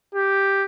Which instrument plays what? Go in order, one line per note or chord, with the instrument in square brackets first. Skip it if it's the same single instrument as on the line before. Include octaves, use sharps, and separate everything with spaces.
[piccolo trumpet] G4